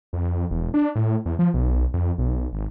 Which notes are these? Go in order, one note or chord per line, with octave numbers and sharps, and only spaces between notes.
F2
E1
D4
A2
E2
F3
B1
F2
B1
G#1